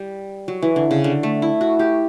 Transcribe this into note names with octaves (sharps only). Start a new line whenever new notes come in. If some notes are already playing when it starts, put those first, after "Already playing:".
Already playing: G3
F#3
E3
D3
C#3
D3
A3
E4
F#4
G4